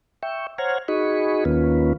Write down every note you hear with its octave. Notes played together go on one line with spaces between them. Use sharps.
E5 G5 C#6
C5 C#5 F#5 A#5 F6 G#6
D#4 F#4 G#4 D#5 B5 C#6
D#2 D#3 A#3 C#4 F4 B4